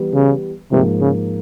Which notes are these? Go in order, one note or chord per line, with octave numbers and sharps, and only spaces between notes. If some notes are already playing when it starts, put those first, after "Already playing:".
Already playing: E3 G3 B3
C#3
G#2 C3 F3 A#3
C#3